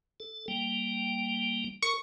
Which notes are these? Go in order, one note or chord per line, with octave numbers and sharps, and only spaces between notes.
A4
G3 A#3 G5
A#4 C#6